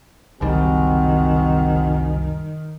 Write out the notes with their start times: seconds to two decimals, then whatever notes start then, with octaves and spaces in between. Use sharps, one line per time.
0.41 F#1 C2 D#3 G3 C4 F#4 G#5